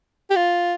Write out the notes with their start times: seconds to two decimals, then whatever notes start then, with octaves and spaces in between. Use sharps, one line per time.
0.31 G4
0.36 F4